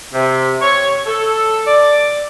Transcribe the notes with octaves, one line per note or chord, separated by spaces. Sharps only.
C3
C#5
A4
D5